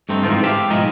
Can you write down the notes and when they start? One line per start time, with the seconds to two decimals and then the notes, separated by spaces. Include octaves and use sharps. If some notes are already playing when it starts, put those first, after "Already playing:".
0.09 G2 A3 C4 D#4
0.23 G#2 E3 F3 C4 D#4 F4
0.44 G4 E5 F5
0.70 B1 G#2 F3 G#3 A#4 D#5